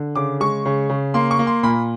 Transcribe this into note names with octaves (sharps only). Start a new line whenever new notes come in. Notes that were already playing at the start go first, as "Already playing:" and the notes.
Already playing: D3
C#3 D6
G#3 C#6
C#3
C#3
A#3 C6
C#6
A#3
C6
A#2 B5